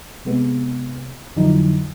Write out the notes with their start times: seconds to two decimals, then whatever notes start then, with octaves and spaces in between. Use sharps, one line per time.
0.25 C3 G#3 B3
1.36 F2 D3 F3 F#3 D#4 E4